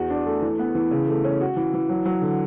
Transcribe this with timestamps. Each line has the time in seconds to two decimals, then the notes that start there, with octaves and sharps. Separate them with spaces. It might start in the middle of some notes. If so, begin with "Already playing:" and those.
Already playing: E2 F#4
0.10 D4
0.26 A3
0.42 E3
0.59 B3
0.75 E3
0.91 C#3
1.08 A3
1.24 C#4
1.41 F#4
1.57 E3
1.74 E3
1.89 F#3
2.05 F#3
2.22 D3